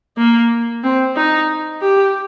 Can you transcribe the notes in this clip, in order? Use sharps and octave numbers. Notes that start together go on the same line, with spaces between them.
A#3
C4
D#4
G4